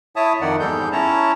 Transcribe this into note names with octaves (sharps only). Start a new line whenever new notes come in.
E4 C#5 E5 A5 D#6
F2 D#3 D#4 D5 F#5
E2 G#2 G3 G#4 A4 G6
C#4 E4 C#5 A5 A#5